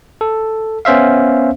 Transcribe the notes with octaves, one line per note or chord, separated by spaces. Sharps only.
A4
B3 C#4 C5 E5 F5